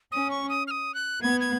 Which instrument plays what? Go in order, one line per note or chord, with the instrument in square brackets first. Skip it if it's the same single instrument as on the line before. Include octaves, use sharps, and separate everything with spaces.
[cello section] C#4 [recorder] D#6
[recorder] C#6
D#6
F6
D#6
F#6
[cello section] B3 [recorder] G#6
[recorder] G#6